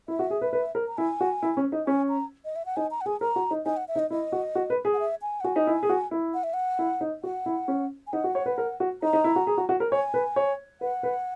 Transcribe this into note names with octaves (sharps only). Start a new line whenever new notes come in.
E4 E5
F#4
G#4
B4
B4
A#4
A#5
E4 G#5
F#4
E4
C#4
D#4
C#4 G#5
A#5
D#5
E5
F#5
D#4 G#5
A#5
F#5
G#4 G#5
A#4 A#5
F#4
D#4
D#4 G#5
F#5
E5
D#4
D#5
E4 D#5
F#4
F#4
B4
G#4
F#5
E5
G#5
F#5
F#4 G#5
D#4
E4
G#4
F#4
E4
F#5
E5
F#5
E4
D#4
F#4 F#5
E4
C#4
G#5
D#4 F#5
F#4
C#5
B4
A#4
F#4
D#4 A#5
D#4
E4
F#4
G#4
F#4
F#4
A#4
C#5 G#5
B4
C#5
B4 F#5
B4